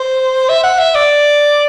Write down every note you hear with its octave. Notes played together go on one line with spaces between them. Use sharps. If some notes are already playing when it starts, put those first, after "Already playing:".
Already playing: C5
E5
F#5
E5
D5